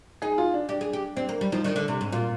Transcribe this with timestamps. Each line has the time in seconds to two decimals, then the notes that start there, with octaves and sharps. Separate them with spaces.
0.22 D#4 G#4
0.38 F4
0.54 D4
0.69 D4 G4
0.81 G#4
0.93 G4
1.16 C4 D4
1.29 A#3
1.41 G3
1.52 F3 D#4
1.64 D#3 D4
1.76 D3
1.88 C3
2.01 G#2
2.12 A#2 F4